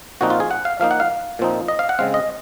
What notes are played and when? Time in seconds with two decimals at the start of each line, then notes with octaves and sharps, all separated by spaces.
0.21 A#2 F3 C4 D#4 F#4
0.30 F4
0.40 G#4
0.51 F#5
0.65 F5
0.80 F3 A#3 D#4 F5
0.91 F#5
1.00 F5
1.39 A#2 F3 C4 D#4
1.68 D#5
1.79 F5
1.89 F#5
1.99 C#3 G#3 C4 F5
2.14 D#5